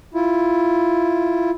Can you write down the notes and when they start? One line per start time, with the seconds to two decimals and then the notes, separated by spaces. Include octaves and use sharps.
0.15 E4 F4